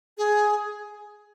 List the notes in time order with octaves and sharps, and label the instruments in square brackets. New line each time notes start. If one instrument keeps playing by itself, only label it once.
[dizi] G#4